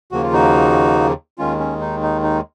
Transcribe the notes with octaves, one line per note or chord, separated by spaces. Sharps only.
D#2 C#3 F3 A#3 F#4
F4
D#4 F#4
D#2 D#3 G#3 C#4 F4
C#4
D#4
D#4
D#4